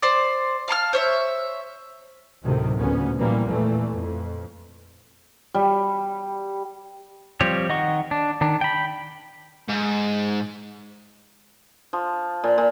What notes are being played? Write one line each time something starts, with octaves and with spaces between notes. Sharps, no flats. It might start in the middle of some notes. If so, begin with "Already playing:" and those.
C5 D5
F5 A5 C6 F6
C5 C#5 E5
D2 A2 C3 D#3 F#3
A1 D2 A#2 C#3 B3 C#4
C2 A#2 E3 F3 G3 A#3
E2 A#2 E3 A3
F2
G3
F3 G3 C4 G4 C#5
D#3 D#5 F#5 C#6
D4
D#3 D4
G5 B5
G#2
F3
A#2
A#2